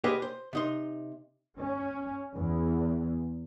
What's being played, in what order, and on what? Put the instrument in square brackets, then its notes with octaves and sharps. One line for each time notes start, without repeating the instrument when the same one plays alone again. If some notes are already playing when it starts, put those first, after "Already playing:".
[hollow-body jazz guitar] G4 G#4 B4 C5 D#5 F5
C5
C3 D#4 C6
[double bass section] C#4
E2